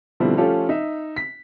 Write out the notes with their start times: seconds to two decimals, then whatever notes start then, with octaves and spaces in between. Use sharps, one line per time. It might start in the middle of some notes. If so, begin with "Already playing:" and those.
0.20 B2 D3 F3 G3 C4 E4
0.37 F3 A3 C#4 F4 G4 A4
0.69 D#4 E5
1.16 B6